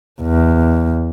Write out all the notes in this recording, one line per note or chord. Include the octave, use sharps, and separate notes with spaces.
E2